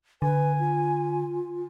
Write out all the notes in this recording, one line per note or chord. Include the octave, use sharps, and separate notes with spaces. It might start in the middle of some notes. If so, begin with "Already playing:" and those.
D3 B4 G#5
F4